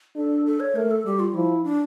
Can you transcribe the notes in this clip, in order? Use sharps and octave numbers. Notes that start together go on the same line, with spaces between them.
D4 A4
A4
C#5
A3 A#4
A4
G3 G4
F4
F3 E4
D4